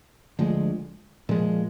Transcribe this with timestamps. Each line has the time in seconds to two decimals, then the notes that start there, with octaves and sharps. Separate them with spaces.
0.39 D2 D3 F3 G#3
1.29 A#2 F3 G#3